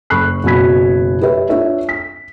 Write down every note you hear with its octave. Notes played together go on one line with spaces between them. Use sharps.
F#1 B5 C#6 F#6 C7
F#1 B2 F#4 B5 G#6 B6
G4 B4 C#5 E5
D4 F4 C#5 E5
B6